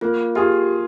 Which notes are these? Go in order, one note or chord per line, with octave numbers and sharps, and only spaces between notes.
A#3 F4
F4 G4 G#4